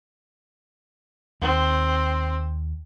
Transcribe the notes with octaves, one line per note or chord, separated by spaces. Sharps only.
D#2 C4